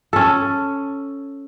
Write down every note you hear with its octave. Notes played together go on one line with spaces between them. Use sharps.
C#4 A4